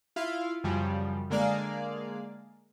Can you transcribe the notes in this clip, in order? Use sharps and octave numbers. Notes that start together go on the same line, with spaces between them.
E4 F4 F5
F#2 C#3 F3 G3
D3 G#3 A#3 G#4 D5 F5